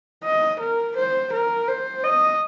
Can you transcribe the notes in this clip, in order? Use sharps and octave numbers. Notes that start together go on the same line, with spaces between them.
D#5
A#4
C5
A#4
C5
D#5